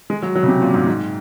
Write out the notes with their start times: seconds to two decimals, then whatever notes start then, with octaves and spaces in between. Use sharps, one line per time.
0.10 G#3
0.23 F#3
0.35 F#3
0.43 C#3
0.48 C3
0.61 A#2
0.74 G#2
0.87 G#2